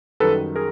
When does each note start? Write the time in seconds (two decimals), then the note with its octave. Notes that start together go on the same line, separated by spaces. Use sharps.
0.20 F#2 D#3 G3 A4 B4
0.56 G#4 A#4